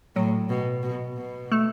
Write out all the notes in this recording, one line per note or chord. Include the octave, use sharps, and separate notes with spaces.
A2 F#3
B2
B2
B2
A3